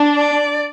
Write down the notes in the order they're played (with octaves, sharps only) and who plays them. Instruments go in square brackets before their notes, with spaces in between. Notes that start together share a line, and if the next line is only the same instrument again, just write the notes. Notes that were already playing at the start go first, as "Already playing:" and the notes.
Already playing: [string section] D4
[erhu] D5